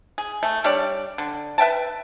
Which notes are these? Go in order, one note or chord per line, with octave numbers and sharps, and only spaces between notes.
G#4
A3
G3 D4 C#5 D5
D3
B4 E5 G5 A5